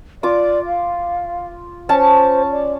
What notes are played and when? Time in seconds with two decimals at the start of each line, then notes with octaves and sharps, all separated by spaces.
0.23 F4 D5 D6
0.66 F5
1.89 C#4 C5 C#5 A5
2.51 D5